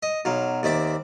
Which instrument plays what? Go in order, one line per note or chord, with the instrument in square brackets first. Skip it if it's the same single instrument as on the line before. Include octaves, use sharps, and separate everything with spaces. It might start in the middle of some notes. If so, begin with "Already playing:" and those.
[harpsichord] D#5
B1 F#3 F5
D#2 C4 D5 E5 D6